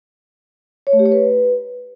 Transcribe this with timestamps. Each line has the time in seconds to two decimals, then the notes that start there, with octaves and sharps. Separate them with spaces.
0.87 C#5
0.93 A3
0.99 G4
1.06 C#5
1.12 B4